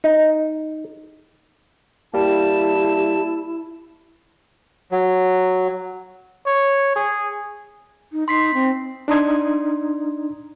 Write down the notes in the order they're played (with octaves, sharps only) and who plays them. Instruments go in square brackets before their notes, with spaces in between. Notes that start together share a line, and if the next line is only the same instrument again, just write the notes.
[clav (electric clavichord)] D#4
[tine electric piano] G3 A#3 [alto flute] E4 [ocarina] G4 [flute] A5
[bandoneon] F#3
[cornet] C#5
G#4
[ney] D#4
[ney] D#4 [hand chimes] C6 B6 C7
[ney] C4
[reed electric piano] D4 D#4 A#5 C6 D#6 G#6